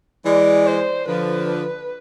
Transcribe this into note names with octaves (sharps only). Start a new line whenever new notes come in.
E3 G#3 D5
C5
D3 F3 B4